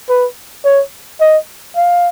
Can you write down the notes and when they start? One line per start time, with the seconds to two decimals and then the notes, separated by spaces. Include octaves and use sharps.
0.09 B4
0.65 C#5
1.21 D#5
1.76 F5